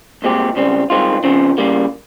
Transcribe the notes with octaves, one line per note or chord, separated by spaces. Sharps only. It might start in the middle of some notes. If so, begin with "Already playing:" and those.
C2 A#2 G#3 C4 G4
C#2 C#3 G3 C4
G2 D#3 G#3 C4 F4
C#3 F3 C4
C#3 G3 A#3